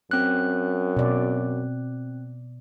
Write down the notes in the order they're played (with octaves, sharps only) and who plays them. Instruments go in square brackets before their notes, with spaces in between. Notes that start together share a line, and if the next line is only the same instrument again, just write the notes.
[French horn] F#2 [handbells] C4 F#6
[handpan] B2 D5